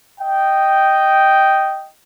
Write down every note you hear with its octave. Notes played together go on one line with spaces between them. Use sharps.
D#5 G5